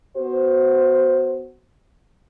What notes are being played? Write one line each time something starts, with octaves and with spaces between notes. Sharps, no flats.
B3 F#4 C5